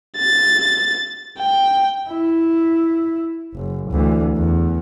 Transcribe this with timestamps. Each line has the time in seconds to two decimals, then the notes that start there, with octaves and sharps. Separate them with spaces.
0.17 A6
1.39 G5
2.08 E4
3.55 F#1
3.90 D2 E3
4.37 E2